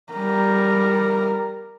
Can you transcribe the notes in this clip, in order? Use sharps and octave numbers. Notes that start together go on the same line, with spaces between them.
G3 A#4